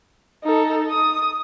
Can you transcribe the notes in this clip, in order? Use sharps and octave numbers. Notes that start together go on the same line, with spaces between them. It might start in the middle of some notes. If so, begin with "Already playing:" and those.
D#4 A4
D#6